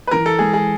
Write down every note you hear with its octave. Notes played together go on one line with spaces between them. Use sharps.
B4
E3 A#4
A4
G#3 G#4
G#4